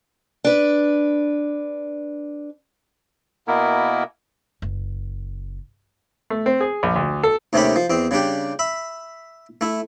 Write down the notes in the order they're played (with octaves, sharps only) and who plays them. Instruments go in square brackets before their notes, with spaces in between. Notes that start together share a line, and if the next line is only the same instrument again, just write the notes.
[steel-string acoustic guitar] D4 B4
[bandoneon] B2 A#3 B3 E4 A#4
[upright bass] F#1
[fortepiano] A3
C4
G#4
A#1
D2
A4
[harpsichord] D#2 C3 A3 C#4 G4 B5
F3
E2 C4
C#3 G3 D4 G4
E5 B5
A3 E4